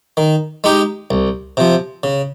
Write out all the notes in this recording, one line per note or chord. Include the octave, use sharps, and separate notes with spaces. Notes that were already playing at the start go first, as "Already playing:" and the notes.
D#3
G#3 D#4 G4
C2
C3 F3
C#3